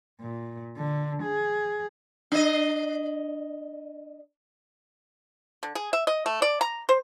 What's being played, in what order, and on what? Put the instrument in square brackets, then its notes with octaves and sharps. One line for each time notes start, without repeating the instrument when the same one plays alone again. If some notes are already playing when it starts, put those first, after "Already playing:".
[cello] A#2
D3
G#4
[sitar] D4 D#5
[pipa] D3
G#4
E5
D#5
A3
D5
A#5
C5